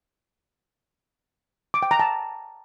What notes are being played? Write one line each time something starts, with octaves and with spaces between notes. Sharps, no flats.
D6
G5
A#5
A5